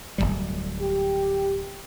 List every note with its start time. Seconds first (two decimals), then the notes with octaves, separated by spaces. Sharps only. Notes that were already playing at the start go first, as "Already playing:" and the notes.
0.18 D1 C#2 G3
0.81 G4